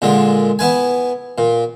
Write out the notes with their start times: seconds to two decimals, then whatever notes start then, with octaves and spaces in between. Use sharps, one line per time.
0.02 A#2 D3 G#3
0.59 B3 E4 B4 G#5
1.38 A#2